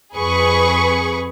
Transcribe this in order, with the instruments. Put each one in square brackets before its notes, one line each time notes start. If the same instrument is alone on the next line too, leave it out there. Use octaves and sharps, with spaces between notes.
[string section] F2 G#4 B4 C#6